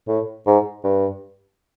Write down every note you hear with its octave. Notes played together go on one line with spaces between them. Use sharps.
A2
G#2
G2